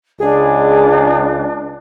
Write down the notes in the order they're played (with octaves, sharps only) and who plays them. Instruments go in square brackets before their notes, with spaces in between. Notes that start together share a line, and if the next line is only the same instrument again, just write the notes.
[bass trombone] C#2 [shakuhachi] D4 [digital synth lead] G#4